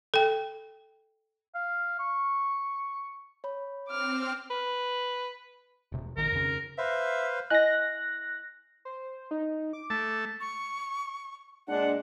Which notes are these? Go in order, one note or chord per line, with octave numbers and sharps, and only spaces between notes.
A4 G5
F5
C#6
C#5 B5
C4 D6 F6
B4
E1 C3
A#1 D#3 A#4
F2 C#3
B4 C5 E5 F5
E4 D#5 G#5 F#6 A#6
C5
D#4
D6
A3 A5
C#6
A#2 G#3 D4 F#5